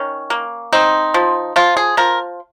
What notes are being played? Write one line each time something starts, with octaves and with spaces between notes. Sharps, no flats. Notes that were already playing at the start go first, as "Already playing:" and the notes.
Already playing: D#3 C#4
A#3
C4 D#4
F3
F3 F4
G#4
F3 A#4